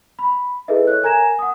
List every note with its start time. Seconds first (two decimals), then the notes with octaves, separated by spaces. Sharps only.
0.19 B5
0.68 E4 G#4 A4 B4 D#5 E5
0.87 C#5 E5 F#6
1.03 A#4 G#5 A#5 G#6 A#6 E7
1.39 F#5 D#6